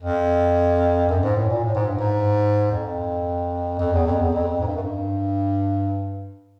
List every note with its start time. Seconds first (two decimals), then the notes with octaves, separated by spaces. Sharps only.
0.01 F2
1.09 F#2
1.23 G#2
1.36 A2
1.50 A#2
1.64 A2
1.75 G#2
1.87 G2
1.99 G#2
2.71 F2
3.79 F2
3.93 E2
4.06 F2
4.19 E2
4.33 F2
4.60 G#2
4.67 G2
4.75 F#2
4.82 G2